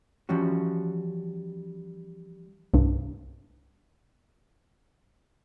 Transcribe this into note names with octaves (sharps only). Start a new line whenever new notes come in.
E3 F3 G3 C#4 F#4
C2 G2